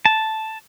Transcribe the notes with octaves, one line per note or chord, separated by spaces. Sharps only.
A5